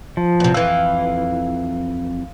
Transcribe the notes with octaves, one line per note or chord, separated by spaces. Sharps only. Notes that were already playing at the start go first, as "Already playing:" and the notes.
F3
E2 C3
F2 E3 F5 E6